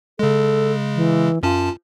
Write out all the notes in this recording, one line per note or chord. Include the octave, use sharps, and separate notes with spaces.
C#3 G#3 A4
E3
F#2 C#4 F4 A5